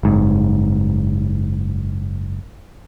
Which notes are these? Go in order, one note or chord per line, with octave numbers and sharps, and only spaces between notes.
F#1 G#2